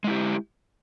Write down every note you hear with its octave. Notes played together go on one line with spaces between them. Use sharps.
G#3 E4 G4